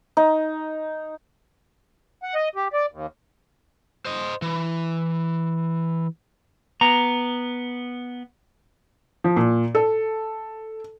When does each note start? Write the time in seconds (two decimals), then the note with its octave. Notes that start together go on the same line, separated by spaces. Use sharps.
0.17 D#4
2.23 F#5
2.35 D#5
2.56 G4
2.73 D5
2.91 D#2
4.05 C5 D#5
4.42 E3
6.81 B3 A#5
9.24 F3
9.36 A#2
9.75 A4